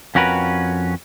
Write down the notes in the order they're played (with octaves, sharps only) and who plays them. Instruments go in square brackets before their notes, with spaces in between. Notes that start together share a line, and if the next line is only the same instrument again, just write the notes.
[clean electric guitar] F2 C#4 F#4 A#4 B4